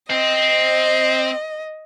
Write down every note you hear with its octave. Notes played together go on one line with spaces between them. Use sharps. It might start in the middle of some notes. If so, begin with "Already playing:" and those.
C4 D#5